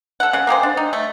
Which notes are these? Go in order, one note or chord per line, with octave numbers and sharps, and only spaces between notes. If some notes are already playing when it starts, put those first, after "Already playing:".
A4 F#5
C#3 F#5
A#3 G4 G#4 C5
D4
D#4
A3